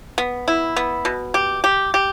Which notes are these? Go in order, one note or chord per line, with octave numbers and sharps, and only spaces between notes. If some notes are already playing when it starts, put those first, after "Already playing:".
B3
E4
B3
B2
G4
G4
G4